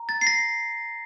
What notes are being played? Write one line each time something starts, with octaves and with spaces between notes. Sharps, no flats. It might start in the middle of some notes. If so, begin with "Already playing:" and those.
Already playing: A#5
A6
C7
A#6